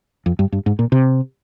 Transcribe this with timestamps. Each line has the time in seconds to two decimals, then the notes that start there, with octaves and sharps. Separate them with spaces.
0.26 F2
0.39 G2
0.52 G2
0.66 G#2
0.79 A#2
0.92 C3